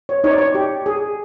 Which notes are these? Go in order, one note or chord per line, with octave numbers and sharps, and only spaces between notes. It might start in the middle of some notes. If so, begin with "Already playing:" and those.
C#5
D#4 C#5
D5
C#5
G4
G#4